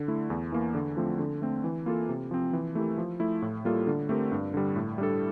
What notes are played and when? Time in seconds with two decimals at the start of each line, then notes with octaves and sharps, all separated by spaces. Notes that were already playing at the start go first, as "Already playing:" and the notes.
Already playing: D3
0.08 A3 E4
0.30 E2
0.52 E3 A#3
0.75 D3
0.97 F3 A3 C4
1.19 D3
1.42 A3 C4
1.64 E3
1.86 A#3 F4 A4
2.09 C3
2.31 F3 C4
2.53 E3
2.75 A3 E4 G4 A#4
2.98 F3
3.20 A3 E4
3.42 A2
3.65 G3 A#3 F4 A4
3.87 D3
4.09 A3 C4 G4 A#4
4.32 G2
4.54 D3 G3
4.76 A2
4.98 G3 D4 A4